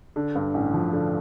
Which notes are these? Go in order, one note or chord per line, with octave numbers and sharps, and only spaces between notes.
D3
G2
A1
F3
D3